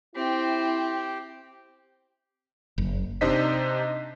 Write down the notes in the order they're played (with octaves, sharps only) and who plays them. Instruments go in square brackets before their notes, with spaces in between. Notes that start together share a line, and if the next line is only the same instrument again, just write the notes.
[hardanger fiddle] C4 [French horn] E4 [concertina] G4
[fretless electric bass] F#1
[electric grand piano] C3 D4 D#4 C5 D#5 B6